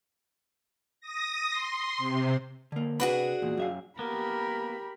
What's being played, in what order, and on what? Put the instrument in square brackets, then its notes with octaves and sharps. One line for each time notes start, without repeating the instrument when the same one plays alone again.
[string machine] D#6 A#6
C6
C3
[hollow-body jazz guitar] D3 A#3
[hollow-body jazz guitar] C3 B4 B5 [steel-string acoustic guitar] D4 F#4 G#4
[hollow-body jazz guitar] E2 A#2
F#2 E5 F5
[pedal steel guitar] A#3 B3 [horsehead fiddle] G4 B5 [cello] A#4